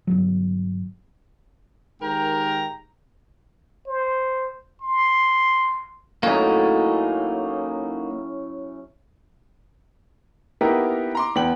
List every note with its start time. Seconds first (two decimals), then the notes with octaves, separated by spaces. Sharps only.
0.07 G1 D#2 F#3
2.01 G#2 D#3 G4 A#4 G5 A#5
3.88 C5
4.82 C6
6.23 A2 F#3 A#3 C#4 D#4
10.61 A#3 B3 D#4 E4 G4 A#4
11.15 A#5 C6 D6
11.35 E2 B3 G5 F#7